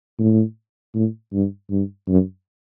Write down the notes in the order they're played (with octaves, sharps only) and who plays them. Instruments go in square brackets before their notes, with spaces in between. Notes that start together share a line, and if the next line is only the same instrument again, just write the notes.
[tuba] A2
A2
G2
G2
F#2